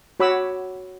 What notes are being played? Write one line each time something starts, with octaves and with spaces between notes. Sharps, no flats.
F#4 C#5 B5 D6 E6